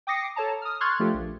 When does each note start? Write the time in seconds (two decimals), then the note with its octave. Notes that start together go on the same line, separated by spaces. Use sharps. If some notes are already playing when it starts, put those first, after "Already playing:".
0.07 G5 D6 D#6 A#6 C7 C#7
0.36 A4 C#5 A5 A#5
0.62 D#6 F6
0.81 C6 C#6 F6 F#6 G#6 A6
0.99 F3 A3 D4 F4 G4 A4
1.14 A#1